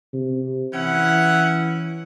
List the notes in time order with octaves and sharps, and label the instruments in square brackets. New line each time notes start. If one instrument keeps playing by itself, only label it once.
[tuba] C3
[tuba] E3 [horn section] C#4 E4 F#5